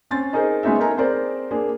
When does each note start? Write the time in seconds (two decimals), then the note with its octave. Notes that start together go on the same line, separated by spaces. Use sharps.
0.11 C4 C#4 C6 A6
0.33 D#4 G#4 A#4 C5 D#5
0.63 G#3 B3 C#4 D#4 E5
0.79 D#4 A4 A#4 G#5 A#5
0.97 C4 G#4 A#4 C5 D5
1.51 A#3 D4 G#4